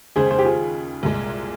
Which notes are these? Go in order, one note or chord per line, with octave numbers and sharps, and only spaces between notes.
D#2 C#3 G#3 G#4 C5
G#4 C5
G4
F4 G#4
C2 A#2 G#3